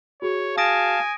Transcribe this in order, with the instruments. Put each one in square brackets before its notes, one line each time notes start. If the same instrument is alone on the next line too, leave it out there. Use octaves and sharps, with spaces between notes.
[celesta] F#4 G#4 [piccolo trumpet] C#5
[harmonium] F5 A5 [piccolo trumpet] G#5 [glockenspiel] D#6 A#6 D7